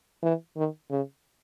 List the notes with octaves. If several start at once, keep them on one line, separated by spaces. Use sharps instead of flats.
E3
D#3
C#3